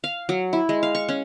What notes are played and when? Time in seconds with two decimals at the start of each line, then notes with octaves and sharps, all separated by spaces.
0.04 F5
0.29 F#3
0.53 E4
0.69 G#3
0.83 F5
0.95 C#6
1.09 C#4